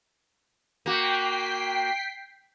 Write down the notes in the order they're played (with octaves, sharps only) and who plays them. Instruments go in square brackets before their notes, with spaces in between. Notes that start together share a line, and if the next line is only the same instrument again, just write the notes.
[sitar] A#3 F#4 [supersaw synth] G5 B6 C7